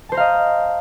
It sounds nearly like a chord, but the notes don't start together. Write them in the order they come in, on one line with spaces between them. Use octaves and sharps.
A5 C5 A#5 F5 D#5